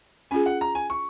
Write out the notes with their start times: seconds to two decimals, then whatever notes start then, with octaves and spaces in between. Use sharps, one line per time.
0.31 C#4 F4 G#4 G#5
0.46 F#5
0.61 A#5
0.75 G#5
0.90 C#6